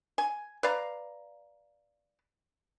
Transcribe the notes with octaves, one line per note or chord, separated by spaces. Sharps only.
G#5
B4 D5 F5 A#5